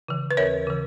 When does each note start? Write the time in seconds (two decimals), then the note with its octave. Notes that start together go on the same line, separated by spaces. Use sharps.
0.08 C#3 E3
0.31 B4
0.37 D#2 A#4 C#5
0.67 C#3 E3